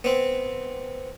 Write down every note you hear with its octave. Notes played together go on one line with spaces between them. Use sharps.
B3 C4